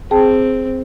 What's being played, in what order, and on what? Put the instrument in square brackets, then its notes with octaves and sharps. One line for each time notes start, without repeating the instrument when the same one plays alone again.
[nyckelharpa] C4 [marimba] G#4 G5 A5